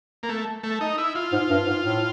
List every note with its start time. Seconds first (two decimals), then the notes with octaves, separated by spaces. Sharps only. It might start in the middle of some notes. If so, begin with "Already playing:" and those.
0.23 A#3
0.29 A3
0.63 A3
0.81 D#4
0.98 E4
1.15 F4
1.32 G#2
1.50 G2
1.66 G#2
1.83 A2